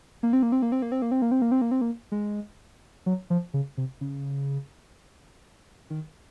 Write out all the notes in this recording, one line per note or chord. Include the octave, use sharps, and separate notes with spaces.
A#3
C4
A#3
C4
A#3
C4
A#3
C4
A#3
C4
A#3
C4
A#3
C4
A#3
C4
A#3
G#3
F#3
F3
C#3
C3
C#3
D#3